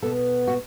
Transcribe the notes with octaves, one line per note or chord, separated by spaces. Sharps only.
B2 B3 A4
F#4